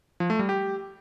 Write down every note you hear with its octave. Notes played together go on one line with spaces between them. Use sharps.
F3
A3
G3
G4